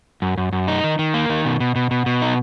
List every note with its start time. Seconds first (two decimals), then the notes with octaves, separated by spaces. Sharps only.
0.22 F#2
0.38 F#2
0.53 F#2
0.68 D#4
0.84 D#3
0.99 D#3
1.14 A#3
1.30 D#3
1.45 B2
1.60 B2
1.76 B2
1.91 B2
2.06 B2
2.22 D#4